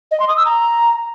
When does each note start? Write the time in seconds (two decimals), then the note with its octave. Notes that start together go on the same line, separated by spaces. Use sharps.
0.11 D#5
0.20 C6
0.28 D#6
0.37 E6
0.45 A#5